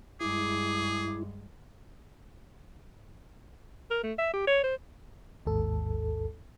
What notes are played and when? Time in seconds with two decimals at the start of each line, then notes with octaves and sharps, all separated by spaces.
0.20 G2 G#3 E4 G#4 D6
3.91 A#4
4.03 A3
4.18 E5
4.34 G4
4.47 C#5
4.64 C5
5.45 A1 D#2 G#2 A4